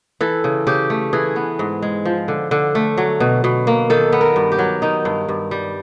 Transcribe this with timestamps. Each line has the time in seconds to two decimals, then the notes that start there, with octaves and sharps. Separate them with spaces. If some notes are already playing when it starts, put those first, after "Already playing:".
0.21 E3 A4
0.44 C#3
0.67 C#3 G4
0.90 A3
1.13 E3 G#4
1.36 B3
1.59 G#2
1.82 G#3
2.05 F3
2.28 D3
2.51 D3
2.75 A3
2.97 F#3
3.20 B2
3.44 B2
3.67 A#3
3.90 D#3 A4
4.13 B3
4.21 A#4
4.36 G2
4.52 G4
4.59 F#3
4.82 D#3 D#4
5.05 G2
5.29 G2
5.51 G3